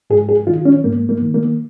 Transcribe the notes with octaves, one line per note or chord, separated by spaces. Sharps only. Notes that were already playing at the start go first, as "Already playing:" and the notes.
G#2 G#4
G#4
D#3 F4
C#4
G#2 A#3
A#3
D#3
A#3